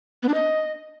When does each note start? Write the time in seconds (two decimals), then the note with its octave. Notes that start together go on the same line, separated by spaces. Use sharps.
0.23 B3
0.28 D4
0.34 D#5